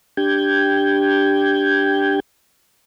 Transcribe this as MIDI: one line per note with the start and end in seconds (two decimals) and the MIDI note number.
0.17 2.20 62
0.17 2.20 67
0.17 2.20 79
0.17 2.20 91
0.17 2.20 92